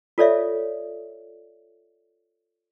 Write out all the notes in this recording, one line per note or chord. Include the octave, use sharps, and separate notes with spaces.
F4 A4 C#5 D5 E5